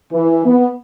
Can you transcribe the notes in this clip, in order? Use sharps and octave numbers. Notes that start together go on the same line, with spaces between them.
E3
B3